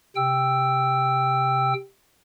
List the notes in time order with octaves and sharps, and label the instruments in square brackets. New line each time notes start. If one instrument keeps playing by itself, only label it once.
[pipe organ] C3 G5 E6